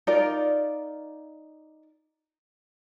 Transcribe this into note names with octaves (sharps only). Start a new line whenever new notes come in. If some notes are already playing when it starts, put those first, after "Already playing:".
D#4 F4 A#4 D5